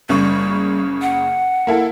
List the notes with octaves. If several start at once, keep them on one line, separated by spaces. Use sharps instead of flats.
F#1 C#3 G3 C#6
F#5
A#3 E4 A4